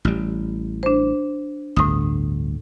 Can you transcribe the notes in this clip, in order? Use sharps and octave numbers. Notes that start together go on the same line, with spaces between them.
A1 G3
D4 C5
G1 D2 A2 D#6